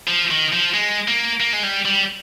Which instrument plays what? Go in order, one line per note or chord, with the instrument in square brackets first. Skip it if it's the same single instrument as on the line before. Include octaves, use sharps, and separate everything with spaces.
[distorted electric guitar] F3
D#3
F3
G#3
A#3
A#3
G#3
G3
G3